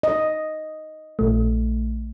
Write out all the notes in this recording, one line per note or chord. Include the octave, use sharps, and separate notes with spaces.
D#5
A#1 A3